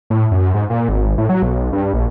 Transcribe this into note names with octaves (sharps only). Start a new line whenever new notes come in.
A2
F#2
G#2
A#2
G#1
A2
F#3
B1
G2
A#1